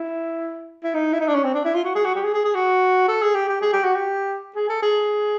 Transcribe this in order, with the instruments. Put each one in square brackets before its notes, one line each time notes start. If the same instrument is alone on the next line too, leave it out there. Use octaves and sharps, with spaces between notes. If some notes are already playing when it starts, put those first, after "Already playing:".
Already playing: [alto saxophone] E4
E4
D#4
E4
D#4
D4
C#4
C4
D4
E4
F4
F#4
G#4
F#4
G4
G#4
G#4
G#4
F#4
A4
G#4
G4
G4
G#4
G4
F#4
G4
G#4
A4
G#4